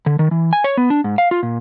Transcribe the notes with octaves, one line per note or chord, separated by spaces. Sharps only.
D3
D#3
E3
G#5
C#5
B3
D4
G#2
F5
F4
A#2